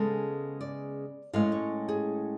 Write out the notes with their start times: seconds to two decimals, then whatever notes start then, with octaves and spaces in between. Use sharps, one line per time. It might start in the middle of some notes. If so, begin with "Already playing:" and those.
Already playing: C#3 G#3 B3 A4
0.61 D5
1.33 A2 G#3 C#4 F5
1.52 C#5
1.89 G#4